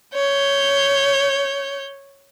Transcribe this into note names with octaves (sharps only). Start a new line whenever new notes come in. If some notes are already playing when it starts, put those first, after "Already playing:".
C#5 G6